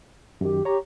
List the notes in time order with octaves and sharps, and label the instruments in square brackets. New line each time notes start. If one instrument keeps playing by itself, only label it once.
[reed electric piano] F#2 D#3 [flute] G4
[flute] G4 [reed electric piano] C#5 A#5